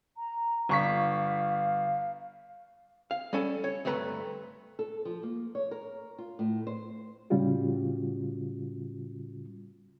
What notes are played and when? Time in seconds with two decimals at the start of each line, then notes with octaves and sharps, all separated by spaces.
0.17 A#5
0.69 G1 F5 C#6 B6
3.11 F5
3.33 G3 C#4 A4
3.64 C#5
3.85 D2 G2 A3 B4 A#5
4.79 A4
5.05 F3
5.23 A#3
5.55 C#5
5.71 A#4
6.18 F4
6.39 A2
6.67 C5
7.30 A2 C#3 G3 C#4 F4 F#4